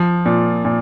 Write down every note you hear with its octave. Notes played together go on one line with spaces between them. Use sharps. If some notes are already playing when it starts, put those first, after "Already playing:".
Already playing: F3
A#2
A#2